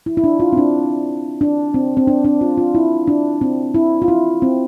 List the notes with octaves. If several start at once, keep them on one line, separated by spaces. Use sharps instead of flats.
E4
E4
D4
F4
C4
D4
D4
C4
C4
D4
D4
F4
F4
E4
D4
C4
E4
F4
E4
C4